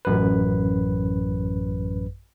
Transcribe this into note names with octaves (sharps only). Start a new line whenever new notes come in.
A1 F#2 B4